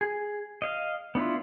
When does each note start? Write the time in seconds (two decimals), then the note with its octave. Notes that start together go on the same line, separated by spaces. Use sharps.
0.01 G#4
0.62 D#5 F5
1.15 B3 D4 E4 F4